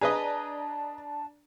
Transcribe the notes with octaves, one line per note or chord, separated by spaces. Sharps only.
D4 G#4 B4 D#5 A5 A#5